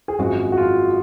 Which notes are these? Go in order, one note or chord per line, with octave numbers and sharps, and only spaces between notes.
G#4
G#1 F#2 F3 G#3 F#4
F#4
F4